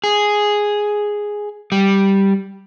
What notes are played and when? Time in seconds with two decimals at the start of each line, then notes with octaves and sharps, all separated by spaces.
0.04 G#4
1.72 G3